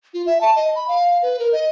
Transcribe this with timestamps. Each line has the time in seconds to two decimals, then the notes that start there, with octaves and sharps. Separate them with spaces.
0.14 F4
0.26 E5
0.41 A5
0.56 D#5
0.75 B5
0.88 F5
1.07 F5
1.22 B4
1.39 A#4
1.52 D#5